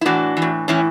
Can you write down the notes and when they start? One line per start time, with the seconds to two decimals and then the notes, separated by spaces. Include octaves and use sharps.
0.01 E4
0.05 A2 E3 D4 F#4
0.37 E3
0.42 A2
0.68 A2 E3 C#4 E4